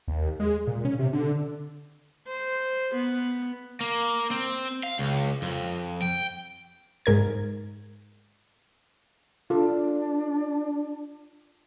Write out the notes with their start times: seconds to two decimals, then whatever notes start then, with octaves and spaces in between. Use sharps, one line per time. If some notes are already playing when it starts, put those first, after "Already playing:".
0.08 D#2
0.40 G#3
0.67 A#2
0.85 C#4
0.99 C3
1.13 D3
2.27 C5
2.95 B3
3.81 A#3
4.31 C4
4.83 F5
4.99 C#2
5.42 F2
6.02 G5
7.06 G#2 A#4 G#6
9.50 D4 F4 A4